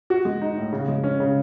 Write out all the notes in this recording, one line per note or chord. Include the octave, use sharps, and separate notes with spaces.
F#4
G#3
D#4
A2
C#3
G#3
C#4
C#3